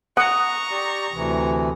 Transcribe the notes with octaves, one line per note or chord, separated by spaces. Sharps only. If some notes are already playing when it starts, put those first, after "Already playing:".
F#5 A#5 C#6 D#6
G4 D5
D2 C3 E3